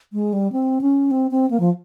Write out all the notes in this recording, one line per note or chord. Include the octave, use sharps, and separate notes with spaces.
G#3
G3
C4
C#4
C4
C4
A#3
F3